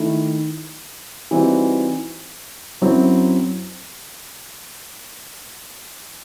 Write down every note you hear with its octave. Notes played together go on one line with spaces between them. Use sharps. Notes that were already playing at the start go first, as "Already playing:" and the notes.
Already playing: D#3 A3 E4
E3 G3 C4 D#4 F#4
F#2 F#3 C4 E4